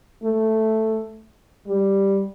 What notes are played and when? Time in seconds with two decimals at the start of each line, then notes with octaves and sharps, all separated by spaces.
0.24 A3
1.67 G3